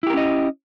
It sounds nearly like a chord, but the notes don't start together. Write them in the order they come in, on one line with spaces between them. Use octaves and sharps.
E4 G4 A#4 C#4 D#5